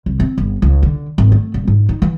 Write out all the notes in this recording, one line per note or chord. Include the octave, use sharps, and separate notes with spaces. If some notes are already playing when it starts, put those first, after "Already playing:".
C2
C4
G1
C#2
D3
G#1
A3
D#1
G#2
D#4
E3